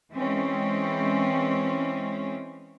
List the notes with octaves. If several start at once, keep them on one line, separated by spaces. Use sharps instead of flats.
E3 G#3 C4 C#4